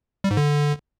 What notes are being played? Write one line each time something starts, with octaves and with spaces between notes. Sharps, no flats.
G3
G#2
D3